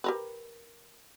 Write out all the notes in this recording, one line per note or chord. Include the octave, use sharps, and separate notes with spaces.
G4 A#4 B4